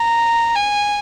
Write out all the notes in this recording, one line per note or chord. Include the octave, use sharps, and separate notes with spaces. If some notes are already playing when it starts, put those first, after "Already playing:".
Already playing: A#5
G#5